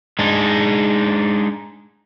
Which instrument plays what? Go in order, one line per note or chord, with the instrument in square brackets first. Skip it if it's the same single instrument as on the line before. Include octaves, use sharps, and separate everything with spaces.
[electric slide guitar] G#3 D4 D#4